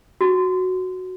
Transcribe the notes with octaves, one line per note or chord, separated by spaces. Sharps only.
F#4